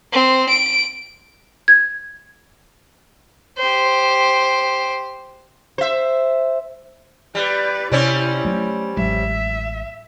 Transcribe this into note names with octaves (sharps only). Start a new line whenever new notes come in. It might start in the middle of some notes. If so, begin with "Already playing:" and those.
C4
D7
G#6
G4 C5
C5 E5
G3 B4 D5
C3 G3 C4 C#4 E4
F#3 A3
A1 F#3 G#3 E5